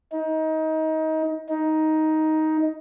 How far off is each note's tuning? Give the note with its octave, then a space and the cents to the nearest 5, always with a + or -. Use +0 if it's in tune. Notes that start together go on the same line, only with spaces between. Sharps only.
D#4 +25
D#4 +10